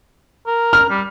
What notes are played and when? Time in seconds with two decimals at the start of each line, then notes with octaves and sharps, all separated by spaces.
0.47 A#4
0.73 F6
0.90 G3